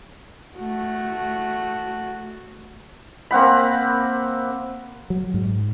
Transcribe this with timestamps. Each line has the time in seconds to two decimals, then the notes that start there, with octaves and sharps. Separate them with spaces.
0.56 A3 F#4
3.31 A#3 C4 F#5 B5
5.10 F#3
5.34 G#2